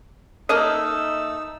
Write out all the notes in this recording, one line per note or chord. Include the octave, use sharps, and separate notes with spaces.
A3 A#3 D#4 D#5 E6